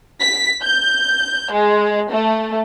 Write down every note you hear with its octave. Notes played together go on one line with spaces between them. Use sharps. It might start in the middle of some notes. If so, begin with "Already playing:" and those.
B6
G6
G#3
A3